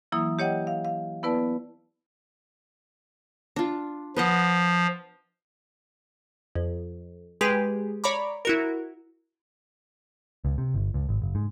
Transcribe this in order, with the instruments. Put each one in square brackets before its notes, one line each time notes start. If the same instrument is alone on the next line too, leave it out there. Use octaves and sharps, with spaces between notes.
[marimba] E3 F#3 A#3 E4 D#6
G4 C#5 D#5 F#5 G5
F5
F5
B3 E4 B4 D5 A5
[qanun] D4 F4
[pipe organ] F3 [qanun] B4 D#5 F#5
[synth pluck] F2
G#3 G4 G#4 B4
C#5 D5 A#5 B5 D6
E4 F#4 A#4
[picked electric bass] C#2
C3
G1
C#2
G#1
F#1
G#2